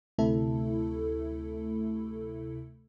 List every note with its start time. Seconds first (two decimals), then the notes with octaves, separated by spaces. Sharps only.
0.18 D2 C3 A3 E4 A4